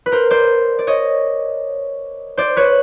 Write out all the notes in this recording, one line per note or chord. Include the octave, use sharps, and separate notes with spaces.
B4
A#4 C5
C5 D5
D5
C#5 D#5
C5 D5
B4 C#5